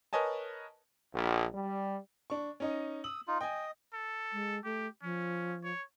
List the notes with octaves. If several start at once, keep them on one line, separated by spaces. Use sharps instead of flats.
A#4 B4 C#5 D#5 G#5 A5
A#1
G3
D4 C#6
C#4 D#4 D#5
D#6 E6 F#7
D#4 F4
D#5 G5 G#5
A4
G#3
A3 G4
F3 C#4
C#5